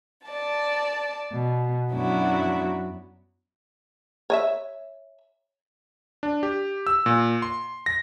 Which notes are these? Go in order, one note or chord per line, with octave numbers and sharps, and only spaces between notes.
D5 A5
B2
F#2 F#3 B3 D4 E4 F#4
C#5 D#5 E5
D4
G4
E6
A#2
C6
A#6